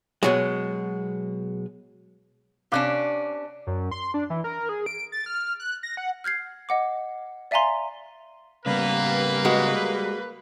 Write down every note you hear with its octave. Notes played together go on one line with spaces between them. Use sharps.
B2 F#3 G#3
C3 C#4 D4 F5 D6 F#6
F#2
C6
D4
E3
A#4
G#4
D7
A6
F6
F#6
A#6
F#5
F6 G6 G#6 C7
D#5 F#5 D6
D5 E5 F5 G#5 A#5 C6
C#3 G3 A#3 B3 B4
G#3 F#4